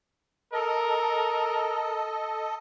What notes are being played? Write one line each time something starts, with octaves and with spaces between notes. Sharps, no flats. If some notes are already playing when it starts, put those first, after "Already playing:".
A4 A#4 D#5